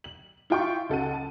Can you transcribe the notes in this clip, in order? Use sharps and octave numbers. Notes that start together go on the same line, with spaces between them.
F#7
E4 F4 G5 C6 C#6
C#2 A4 F#5 D#7
A5